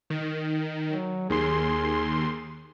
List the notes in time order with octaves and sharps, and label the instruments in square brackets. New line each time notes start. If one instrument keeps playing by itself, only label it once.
[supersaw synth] D#3
[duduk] F#3
[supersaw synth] D#2 C6 [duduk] G#4